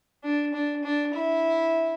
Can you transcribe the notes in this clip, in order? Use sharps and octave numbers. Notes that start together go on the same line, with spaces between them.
D4
D4
D4
E4